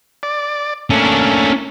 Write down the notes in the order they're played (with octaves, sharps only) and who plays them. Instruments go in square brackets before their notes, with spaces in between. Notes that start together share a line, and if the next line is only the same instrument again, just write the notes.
[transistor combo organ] D5
[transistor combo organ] A3 A#3 [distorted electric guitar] C#4 D4